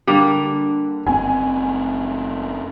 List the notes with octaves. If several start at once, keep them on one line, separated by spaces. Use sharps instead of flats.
D3 G3 A#3
F#1 C4 G#5